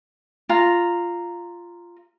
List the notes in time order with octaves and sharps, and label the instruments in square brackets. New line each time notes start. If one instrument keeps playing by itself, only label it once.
[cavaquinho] F4 A#5